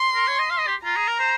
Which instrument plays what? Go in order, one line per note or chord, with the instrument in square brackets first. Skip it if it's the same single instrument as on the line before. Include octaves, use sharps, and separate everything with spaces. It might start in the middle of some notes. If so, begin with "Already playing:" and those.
Already playing: [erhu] C6
[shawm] A#4
C#5
D#5
F5
D#5
G4
[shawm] F4 [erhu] A#5
[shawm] G#4
A#4
C5